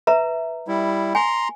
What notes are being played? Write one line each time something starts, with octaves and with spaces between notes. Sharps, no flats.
B4 E5 A#5
G3 E4
G#5 A#5 C6